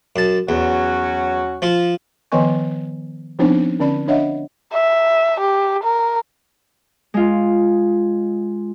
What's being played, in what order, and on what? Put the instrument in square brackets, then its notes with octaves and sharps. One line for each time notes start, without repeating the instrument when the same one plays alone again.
[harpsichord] F#2 A5
[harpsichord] E2 [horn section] F#3 C#4 F#4
[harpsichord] F3 F4
[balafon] D#3 F3 B3 D#5 G#5 C#6
F3 B3 C4 D4 D#4 C5
D3 C#4 D5 B5
D4 C#5 D#5 E5 F#5
[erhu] E5
G4
A#4
[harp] G#3 F4